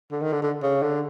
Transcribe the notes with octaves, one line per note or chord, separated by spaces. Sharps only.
D3
D#3
D3
D3
C#3
D3